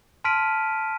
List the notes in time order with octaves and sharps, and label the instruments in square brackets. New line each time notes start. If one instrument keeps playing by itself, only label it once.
[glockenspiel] A5 C6 F6 B6 D7 D#7